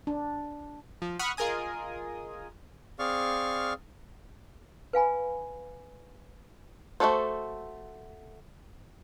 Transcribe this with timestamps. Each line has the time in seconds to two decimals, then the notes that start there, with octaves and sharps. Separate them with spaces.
0.07 D4
1.02 F3
1.19 F#5 B5 C#6 D#6 F6
1.37 F4 G#4 A#4 D#5 G#5 D#6
2.99 C4 G#4 D5 F5 C#6 F6
4.93 B4 F5 G#5 B5
7.00 A3 F4 F#4 A4 C5